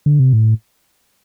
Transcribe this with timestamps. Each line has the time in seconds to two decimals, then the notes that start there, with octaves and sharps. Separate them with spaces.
0.06 D3
0.19 C3
0.33 A2